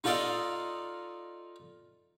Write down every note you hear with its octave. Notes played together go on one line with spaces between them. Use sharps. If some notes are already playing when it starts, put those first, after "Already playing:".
D#4 F4 A4 D5 D#5 F5